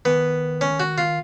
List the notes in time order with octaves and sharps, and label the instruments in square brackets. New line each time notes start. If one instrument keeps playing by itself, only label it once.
[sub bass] D#3 [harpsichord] B3
[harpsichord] C#4
F#4
F4